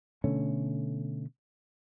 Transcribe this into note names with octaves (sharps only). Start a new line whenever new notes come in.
B2 D3 A3 C#4